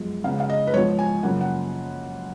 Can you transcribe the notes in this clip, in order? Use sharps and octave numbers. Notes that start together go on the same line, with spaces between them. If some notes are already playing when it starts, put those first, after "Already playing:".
Already playing: F#2 F3 G#3 B3
C#3 G#3 B3 F5
F5
D#5
B4
G#2 F3 B3 C#5
G#5
F#2 C#3 F3 A#3 F#5
F#5